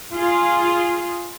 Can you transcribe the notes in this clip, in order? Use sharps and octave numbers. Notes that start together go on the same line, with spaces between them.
F4 G#4